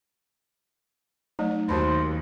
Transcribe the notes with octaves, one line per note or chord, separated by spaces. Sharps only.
F#3 A3 D#4 C#5
D#2 F#4 C5 A5 B5